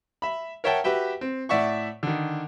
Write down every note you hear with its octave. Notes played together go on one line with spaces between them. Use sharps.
E5 B5
A#4 C#5 E5 F#5 G5 A5
F#4 G4 B4 E5 G5
C4
A2 D5 E5 F#5 C#6
D3 D#3